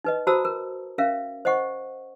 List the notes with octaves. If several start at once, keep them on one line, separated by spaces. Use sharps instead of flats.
D#4 B4 D#5
F#4 C5 A5 A#5 D#6 E6
A#4
C#4 A#4 E5 F5
C5 D#5 F#5 C#6